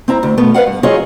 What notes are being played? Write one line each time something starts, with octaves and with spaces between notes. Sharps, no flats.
C4 E4 A#5
D2
B2 A3 B3
B4 D5 F5 F#5
G2
F#3 F4 G#4 C#5 D#5 F5